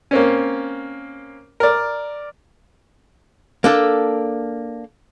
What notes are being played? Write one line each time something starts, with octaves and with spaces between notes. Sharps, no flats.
A#3 C4 C#4
A#4 D5
A#3 D4 A4